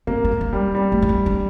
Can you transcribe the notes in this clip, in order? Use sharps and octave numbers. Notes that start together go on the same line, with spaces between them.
A#3 C4
C4
D4
G3
G3
A3
D4
C4
D4